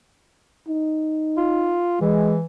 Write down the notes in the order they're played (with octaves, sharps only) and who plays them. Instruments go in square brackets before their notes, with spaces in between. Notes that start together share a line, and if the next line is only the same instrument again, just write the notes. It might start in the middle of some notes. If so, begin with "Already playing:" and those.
[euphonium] D#4
[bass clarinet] F4
[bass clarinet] E3 [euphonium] G#3